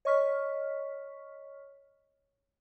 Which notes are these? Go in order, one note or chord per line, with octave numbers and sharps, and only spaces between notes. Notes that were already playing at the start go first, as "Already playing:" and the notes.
C#5 D#5 C#6 F6 B6